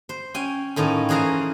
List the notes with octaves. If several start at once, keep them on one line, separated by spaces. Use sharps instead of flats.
C5
C#4 G5 G#5
A2 D#3 C#4 F4
E3 C#4 G#4 A#4 C5